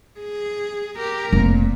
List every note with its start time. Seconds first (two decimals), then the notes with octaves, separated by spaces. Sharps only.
0.20 G#4
0.97 G4 A#4
1.33 F1 A#2